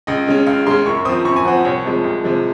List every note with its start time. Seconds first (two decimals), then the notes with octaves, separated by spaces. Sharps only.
0.07 C#2 D#5
0.27 C#3 G#3 C#4
0.47 C#2 F5
0.67 C#3 G#3 C#4 C6
0.86 F#2 C#6
1.05 F3 C4 D#6
1.25 F#2 C#6
1.36 G#5
1.45 F3 C4 F#5
1.65 C2 C#5
1.85 C3 F3 G#3
2.04 C2
2.24 C3 F3 G#3